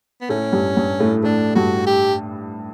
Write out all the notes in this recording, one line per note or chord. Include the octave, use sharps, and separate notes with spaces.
B3
A2 A3 C#4
G2 G3
G2 G3
A2 A3
A2 A3 D4
G2 G3 F#4
G4